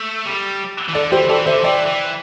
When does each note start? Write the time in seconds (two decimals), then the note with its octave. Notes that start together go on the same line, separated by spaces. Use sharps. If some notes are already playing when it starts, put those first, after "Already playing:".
Already playing: A3
0.26 G3
0.89 E3
0.94 D3 A4 D5
1.12 E3 G4 C5
1.29 E3 A4 D5
1.46 D3 C5 E5
1.64 E3 D5 G5
1.86 E3